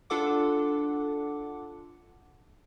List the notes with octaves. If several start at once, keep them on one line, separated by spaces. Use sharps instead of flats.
D4 F4 A4 F#5 D6